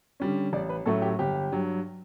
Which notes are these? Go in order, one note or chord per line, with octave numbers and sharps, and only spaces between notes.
D3 G3 C#4
A1 D5
B4
A2 F#3 A3 C#4 A4
G4
G1 G4
G2 F#3